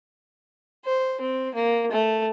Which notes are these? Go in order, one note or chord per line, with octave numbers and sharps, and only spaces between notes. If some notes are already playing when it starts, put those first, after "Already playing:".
C5
C4
A#3
A3